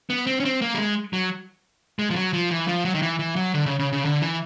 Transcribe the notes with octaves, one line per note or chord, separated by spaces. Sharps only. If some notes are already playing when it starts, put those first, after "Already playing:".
B3
C4
C#4
C4
A#3
G3
G#3
F#3
G#3
F3
F#3
F3
E3
F3
F#3
D#3
E3
E3
F#3
D3
C#3
C#3
C#3
D3
E3